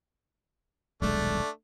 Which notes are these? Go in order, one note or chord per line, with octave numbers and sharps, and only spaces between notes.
D#1 B1 G#3 A3 D4